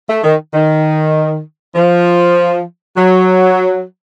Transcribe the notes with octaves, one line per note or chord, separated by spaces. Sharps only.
A3
D#3
D#3
F3
F#3